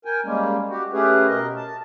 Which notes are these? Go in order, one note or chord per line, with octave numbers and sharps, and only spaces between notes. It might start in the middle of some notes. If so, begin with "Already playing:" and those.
A#4 G5 G#5
G3 G#3 A#3 C#4
F#4 G4
A3 C#4 G4 G#4 B4
B2 A#4 D#5
A5